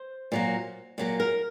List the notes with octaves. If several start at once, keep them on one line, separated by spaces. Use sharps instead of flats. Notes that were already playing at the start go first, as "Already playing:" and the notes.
Already playing: C5
A#2 F#3 A#3
A#2 F#3 A#3
A#4